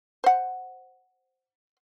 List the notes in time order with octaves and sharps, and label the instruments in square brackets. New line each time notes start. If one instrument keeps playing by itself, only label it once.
[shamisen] C5 F#5